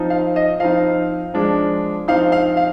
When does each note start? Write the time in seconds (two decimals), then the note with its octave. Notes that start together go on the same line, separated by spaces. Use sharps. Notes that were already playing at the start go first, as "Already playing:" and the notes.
Already playing: F3 C4 D#4
0.10 F5
0.36 D#5
0.60 F3 C4 D#4 F5
1.34 F3 G#3 D4
2.08 F3 C4 D#4 F5
2.32 F5
2.57 F5